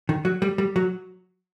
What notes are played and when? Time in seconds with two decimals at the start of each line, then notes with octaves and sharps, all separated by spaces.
0.09 D#3
0.25 F#3
0.42 G3
0.58 G3
0.76 F#3